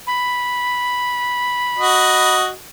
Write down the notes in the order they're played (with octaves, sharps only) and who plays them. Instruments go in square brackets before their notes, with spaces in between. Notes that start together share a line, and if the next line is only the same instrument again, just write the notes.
[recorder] B5
[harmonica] F#4 D#5